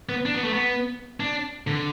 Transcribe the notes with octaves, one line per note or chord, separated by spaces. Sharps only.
B3
D4
B3
A3
B3
D4
D3